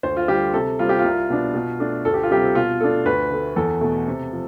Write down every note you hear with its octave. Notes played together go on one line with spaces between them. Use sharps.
D2 C5
F4
D3 G3 G4
C3 A4
G3 C4 F4
G4
C2 F4
B2 B3 D4
B2
A3 D4
D2 A4
G4
F4
C3 G3 C4 G4
B2 F4
A3 D4 A4
D2 B4
D3 A3
E2 A4
B2 A3
C3
F3